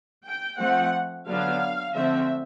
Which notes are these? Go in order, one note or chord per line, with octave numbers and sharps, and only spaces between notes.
G5
F3 A3 C4 F#5
D3 F#3 B3 D4 F5
D3 F3 A3 C4 E5